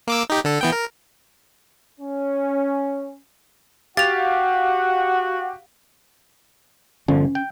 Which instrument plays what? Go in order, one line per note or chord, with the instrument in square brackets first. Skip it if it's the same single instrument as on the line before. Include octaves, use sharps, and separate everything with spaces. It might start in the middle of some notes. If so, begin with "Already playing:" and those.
[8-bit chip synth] A#3 D6 E6
D#4 G4
D3 A4
E3 B3 G5
A#4
[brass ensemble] C#4
[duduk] F#4 [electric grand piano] G4 F5 [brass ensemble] F#5 [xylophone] A6 F7
[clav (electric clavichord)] G1 D3 F3 [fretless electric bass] C#4
[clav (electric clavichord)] G5